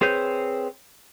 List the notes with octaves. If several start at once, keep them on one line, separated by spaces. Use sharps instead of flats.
C4 G#4 B4 C#5 G6